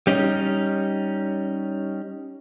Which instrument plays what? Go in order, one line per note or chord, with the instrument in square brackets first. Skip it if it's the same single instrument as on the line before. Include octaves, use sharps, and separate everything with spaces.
[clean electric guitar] G3 C#4 D#4